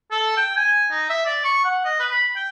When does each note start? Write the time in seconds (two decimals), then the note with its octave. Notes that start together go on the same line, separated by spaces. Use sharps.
0.11 A4
0.37 G5
0.57 G#5
0.91 D#4
1.10 E5
1.25 D5
1.45 C#6
1.65 F#5
1.85 D#5
2.00 B4
2.12 B5
2.36 G5